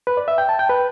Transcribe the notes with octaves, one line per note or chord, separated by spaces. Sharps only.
B4
D5
E5
G5
A5
G5
B4